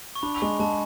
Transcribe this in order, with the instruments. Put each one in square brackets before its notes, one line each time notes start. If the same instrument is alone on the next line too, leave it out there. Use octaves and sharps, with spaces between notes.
[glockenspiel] C#6
[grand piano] D4 [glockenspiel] B5
[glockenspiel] B5
[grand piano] G#3 [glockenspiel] C#6
[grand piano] G#3 [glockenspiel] A5